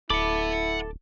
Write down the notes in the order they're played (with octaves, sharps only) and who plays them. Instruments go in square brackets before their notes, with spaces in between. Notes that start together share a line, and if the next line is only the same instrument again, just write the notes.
[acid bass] D1 [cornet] E4 [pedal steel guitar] A4 D6 [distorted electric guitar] F#5 B5